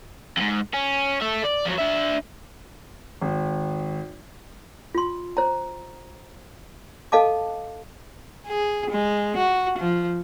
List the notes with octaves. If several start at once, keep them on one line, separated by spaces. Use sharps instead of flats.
F2 G#2
C#4
A4 E5
D5
F3 F#3
D4 E5
G#1
F4 C6
C5 A#5
A4 D#5 F5 A5 D6
G#4
G#3
F#4
F3